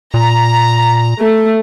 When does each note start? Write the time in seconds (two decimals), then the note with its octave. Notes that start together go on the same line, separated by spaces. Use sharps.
0.14 A#2 A#5
1.19 A3